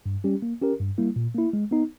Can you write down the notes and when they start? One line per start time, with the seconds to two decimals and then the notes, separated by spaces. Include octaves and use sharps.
0.06 G2
0.24 G3 C#4 G4
0.42 A#3
0.61 C#4 G4 A#4
0.80 G2
0.98 G3 A#3 E4
1.16 A#2
1.35 A#3 E4
1.53 G#3
1.71 B3 D#4